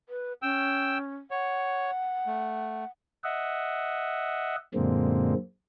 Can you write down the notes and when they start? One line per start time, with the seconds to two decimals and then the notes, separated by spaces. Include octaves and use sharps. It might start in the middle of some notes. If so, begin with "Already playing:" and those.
0.09 B4
0.42 C#4 G5 E6
1.31 C#5 F#5
2.27 A3
3.24 D#5 E5 F#5
4.75 F#2 A#2 D3 G#3 A#3 C4